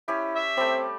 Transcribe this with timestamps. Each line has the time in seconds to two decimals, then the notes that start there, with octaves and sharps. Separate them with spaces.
0.08 C#4 E4 G4
0.35 E5
0.57 G3 A3 C4